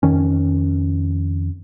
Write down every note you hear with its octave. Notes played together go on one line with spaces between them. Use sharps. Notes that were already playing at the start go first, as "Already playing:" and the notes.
F2 D#3 C#4